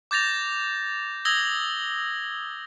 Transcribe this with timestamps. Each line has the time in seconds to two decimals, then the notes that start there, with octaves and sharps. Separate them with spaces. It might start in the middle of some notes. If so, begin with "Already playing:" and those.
0.11 D6 G6 A6 A#6 F7
1.25 D#6 E6 G#6 A#6 F#7 G7